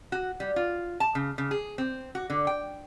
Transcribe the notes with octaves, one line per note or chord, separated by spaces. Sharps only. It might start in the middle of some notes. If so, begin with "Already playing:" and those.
F#4
G3
F4
A5
C#3
C#3
G#4
C4
F#4
D3
G5